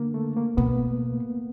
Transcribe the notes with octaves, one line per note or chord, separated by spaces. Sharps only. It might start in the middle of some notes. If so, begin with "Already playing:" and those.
Already playing: D3 A#3
A3
A#3
B2 B3